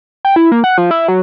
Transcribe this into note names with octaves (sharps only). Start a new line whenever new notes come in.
G5
E4
A#3
F#5
F3
E4
F#3